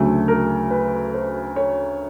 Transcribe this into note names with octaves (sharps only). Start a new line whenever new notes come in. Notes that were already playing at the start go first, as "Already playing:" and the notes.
Already playing: D2 C#3 F#3 A3
A#4
B4
C5
C#5